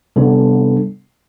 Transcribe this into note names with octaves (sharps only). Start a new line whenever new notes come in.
C3 G3 B3 D4 A4